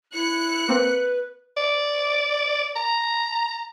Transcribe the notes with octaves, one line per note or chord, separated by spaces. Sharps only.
E4 F#6 C#7
A#3 C4 B4
D5
A#5